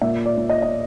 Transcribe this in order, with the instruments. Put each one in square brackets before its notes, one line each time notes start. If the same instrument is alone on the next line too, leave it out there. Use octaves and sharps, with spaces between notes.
[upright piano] A#2 E5
D5
A#2
D#5
D#5